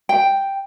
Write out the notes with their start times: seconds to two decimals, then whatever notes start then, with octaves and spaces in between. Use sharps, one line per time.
0.09 G5